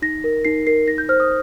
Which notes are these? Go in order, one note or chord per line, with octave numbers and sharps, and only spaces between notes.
D#4 A#6
A#4
D#4 C7
A#4 C7
D#4 A#6
G6
C5 F6
D#6